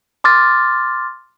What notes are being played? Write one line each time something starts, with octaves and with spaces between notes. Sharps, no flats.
C6 D6 F6 A6